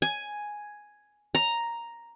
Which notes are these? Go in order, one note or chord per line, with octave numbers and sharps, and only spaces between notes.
G#5
A#5